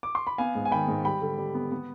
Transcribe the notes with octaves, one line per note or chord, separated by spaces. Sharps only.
D6
C6
B5
B3 F5 G#5
G#2
G#5
D#3 G5 B5
G#2
G3 G5 B5
D3
G3
B3
B3